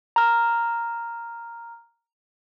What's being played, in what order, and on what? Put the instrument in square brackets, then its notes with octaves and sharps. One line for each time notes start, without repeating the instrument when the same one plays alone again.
[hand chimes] A#5 F6